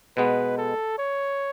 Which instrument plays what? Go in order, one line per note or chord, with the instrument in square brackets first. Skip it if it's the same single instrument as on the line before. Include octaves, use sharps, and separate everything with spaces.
[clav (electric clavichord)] B2 G#3 B3 [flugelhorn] B4
[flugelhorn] A4
C#5